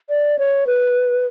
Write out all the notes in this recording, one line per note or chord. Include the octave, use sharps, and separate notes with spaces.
D5
C#5
B4